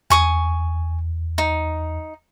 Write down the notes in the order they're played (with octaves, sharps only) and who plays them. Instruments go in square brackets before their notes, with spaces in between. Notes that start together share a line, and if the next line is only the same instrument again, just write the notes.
[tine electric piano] E2 [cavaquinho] G#5 C#6 D#6
[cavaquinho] D#4